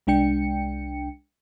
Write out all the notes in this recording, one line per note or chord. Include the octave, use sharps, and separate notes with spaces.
C2 G#3 D4 G5 C#7